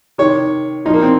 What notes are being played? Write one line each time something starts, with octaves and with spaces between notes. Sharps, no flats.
C3 D#3 C#5
A#2 F3 D#4
A#3
C4